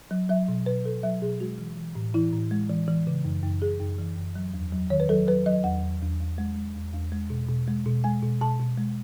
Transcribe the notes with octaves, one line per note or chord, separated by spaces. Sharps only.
F#3
F#3 E5
B2
B2 B4
B2 A4
F#3 E5
B2 G#4
G#3 F#4
E3
E3
A2
E3 E4
A2
G#3
E3
E3
C#3
F#2
F#2
F#2 G#4
F#2
E3
F#2
F#3
E2
F#3
D#3 C#5
B4
F#3 A4
F#3 B4
F#3 D#5
E2 F#5
E2
E2
E2
G#3
G#3
E2
E2
G#3
B2
B2
G#3
B2
G#3 G#5
B2
B2 A5
B2
G#3